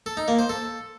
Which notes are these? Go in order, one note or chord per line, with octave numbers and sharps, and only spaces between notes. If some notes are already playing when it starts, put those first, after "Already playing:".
A4
D#4
A#3
C5
A4